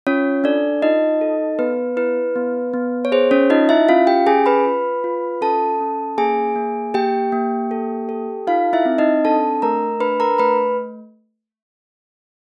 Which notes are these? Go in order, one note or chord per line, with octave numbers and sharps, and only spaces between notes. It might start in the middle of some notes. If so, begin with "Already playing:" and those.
C#4 F4 C#5
D4 A4 D5
D#4 F4 D#5
A4
B3 B4
E4 B4
B3
B3
C#5
G#4 C5
C#4 C#5
D#4 F4 D#5
E4 E5
C#4 F4 F5
G4 G5
C#4 G#4 G#5
B4 B5
F4
F4
C#4 A4 A5
C#4
A#3 G#4 G#5
A#3
A#3 G4 G5
A#3
A4
A4
D#4 F4 F5
E4 E5
C4
D#4 D#5
D4 A4 A5
A3 A#4 A#5
D4 B4 B5
A#4 A#5
A3 B4 B5